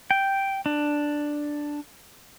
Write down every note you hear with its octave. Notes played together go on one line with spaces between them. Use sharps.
G5
D4